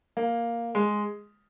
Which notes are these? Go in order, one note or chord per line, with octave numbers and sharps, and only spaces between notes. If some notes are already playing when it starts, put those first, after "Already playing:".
A#3
G#3